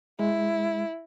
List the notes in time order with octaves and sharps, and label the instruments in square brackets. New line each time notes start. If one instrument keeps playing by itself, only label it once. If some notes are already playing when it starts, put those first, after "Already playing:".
[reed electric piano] G#3 [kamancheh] E4